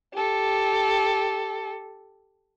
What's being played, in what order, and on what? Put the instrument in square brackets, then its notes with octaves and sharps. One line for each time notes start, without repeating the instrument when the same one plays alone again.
[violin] G4 A4